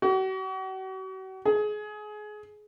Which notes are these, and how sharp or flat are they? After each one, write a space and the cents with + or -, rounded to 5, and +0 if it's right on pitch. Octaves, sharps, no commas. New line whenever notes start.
F#4 +40
G#4 +25